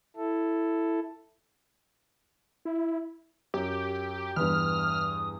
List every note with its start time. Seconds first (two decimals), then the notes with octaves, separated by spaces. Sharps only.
0.16 E4 A4
2.65 E4
3.54 F#2 G4
4.36 E2 G2 B4 D#6 F6